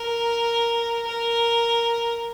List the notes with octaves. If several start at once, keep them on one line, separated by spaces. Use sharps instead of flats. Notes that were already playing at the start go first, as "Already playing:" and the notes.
Already playing: A#4
A#4